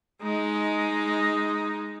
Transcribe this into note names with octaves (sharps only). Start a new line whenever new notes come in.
G#3 D#4